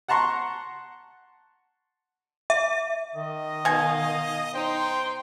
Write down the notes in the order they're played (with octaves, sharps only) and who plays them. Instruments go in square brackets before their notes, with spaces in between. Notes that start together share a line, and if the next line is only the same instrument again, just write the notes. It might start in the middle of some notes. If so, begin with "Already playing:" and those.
[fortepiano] F#5 A5 A#5 C6 C#6
[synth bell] E5
[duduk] D#3 [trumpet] D#5
[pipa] B2 G#5 [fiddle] D#4 F5
[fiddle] D#4 C6 [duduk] C5 [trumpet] G5